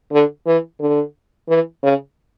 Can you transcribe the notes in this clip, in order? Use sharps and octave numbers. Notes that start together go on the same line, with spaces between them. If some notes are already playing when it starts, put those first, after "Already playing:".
D3
E3
D3
E3
C#3